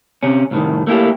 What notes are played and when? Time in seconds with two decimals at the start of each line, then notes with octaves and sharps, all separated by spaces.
0.23 C3 C#4
0.51 C2 A2 D#3
0.87 A3 A#3 E4 G4